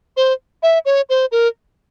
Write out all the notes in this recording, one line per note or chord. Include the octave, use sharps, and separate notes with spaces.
C5
E5
C#5
C5
A#4